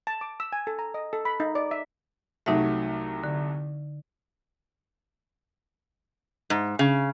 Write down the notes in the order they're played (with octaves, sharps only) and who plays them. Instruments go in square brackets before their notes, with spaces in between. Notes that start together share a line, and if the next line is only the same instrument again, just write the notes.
[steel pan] A5
D6
E6
G#5
A4
A#5
D#5
A4
B5
D#4
D5
E5
[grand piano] C2 F#3 A3 [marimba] D#4 E5
[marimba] D3
[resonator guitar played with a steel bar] G#2
C#3